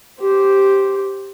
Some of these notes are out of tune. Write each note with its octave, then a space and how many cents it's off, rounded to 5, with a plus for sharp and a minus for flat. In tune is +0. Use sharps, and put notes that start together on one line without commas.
G4 -5 C5 +0